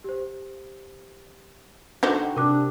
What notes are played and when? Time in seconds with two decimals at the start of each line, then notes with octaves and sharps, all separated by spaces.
0.04 G4 C5
2.03 D3 C4 D#4 F#4 C5
2.36 C3 D4 A#4 D6 F#6